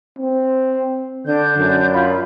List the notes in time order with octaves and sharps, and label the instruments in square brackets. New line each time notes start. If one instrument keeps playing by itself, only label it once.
[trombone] C4
[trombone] D3 [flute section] D4 G6
[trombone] F#2
[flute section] F4 B5